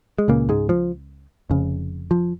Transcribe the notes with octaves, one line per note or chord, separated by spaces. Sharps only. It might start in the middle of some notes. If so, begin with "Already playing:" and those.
G#3
C#2 A#2 C#3 A#3
G#2 G#3
F3
F1 F2 C#3
F3